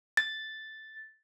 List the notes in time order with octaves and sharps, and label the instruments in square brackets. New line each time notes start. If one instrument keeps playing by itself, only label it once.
[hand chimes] A6